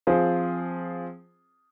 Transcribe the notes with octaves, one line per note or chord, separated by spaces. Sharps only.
F3 C4 F4 G#4 C5